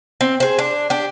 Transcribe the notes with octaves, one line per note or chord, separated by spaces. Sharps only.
C4
G#4 C5
D4
D4 G4